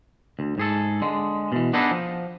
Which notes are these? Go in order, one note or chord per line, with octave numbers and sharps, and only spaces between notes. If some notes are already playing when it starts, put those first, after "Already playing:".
D2
G#2 G#4 A4
D3 G#3
B2 E3
B3 D4 D#4 G#4 A4 B4
F3